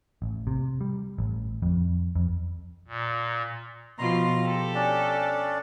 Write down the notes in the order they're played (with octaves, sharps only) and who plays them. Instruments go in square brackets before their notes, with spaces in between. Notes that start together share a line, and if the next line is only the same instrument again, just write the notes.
[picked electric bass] A1
C3
G3
A1
F2
F2
[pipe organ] A#2
[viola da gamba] B2 F3 F4 [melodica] A#5 C6
[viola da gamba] G4 A4
[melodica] C#4 D4 D5